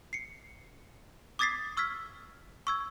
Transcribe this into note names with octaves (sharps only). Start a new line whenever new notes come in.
C7 C#7
D6 D#6 G#6 A6 B6 C7
C#6 E6 F6 G#6 B6
C#6 E6 G#6